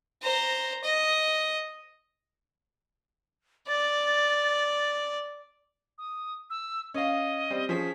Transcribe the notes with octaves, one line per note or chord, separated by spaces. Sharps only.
C5 A#5
D#5
D5 A6
D#6
E6
C#4 D#5 F5
G3 C4
F3 C#4 G#4 B6